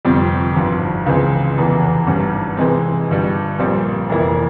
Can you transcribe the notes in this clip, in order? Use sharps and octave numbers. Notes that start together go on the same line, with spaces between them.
G1 F2 C3 G3 C4
G#1 G2 F3
C#2 C#3 E3 G#3 C4
F1 E2 E3
G#1 G2 G3 C#4
C3 E3 G#3 C4
G1 G2 G3
A#1 A#2 G3 C4
F1 F2 E3 A#3 E4